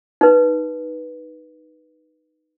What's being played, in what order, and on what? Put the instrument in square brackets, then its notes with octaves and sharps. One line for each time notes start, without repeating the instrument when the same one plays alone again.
[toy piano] D#4 B4